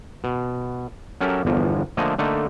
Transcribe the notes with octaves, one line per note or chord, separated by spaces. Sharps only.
B2
F#3 C#4 G4 A4 A#4 E5
G1 E2 F3
D3 F3 A3 A#3 D#5 G#5
D3 A3 A#3 D#4 A4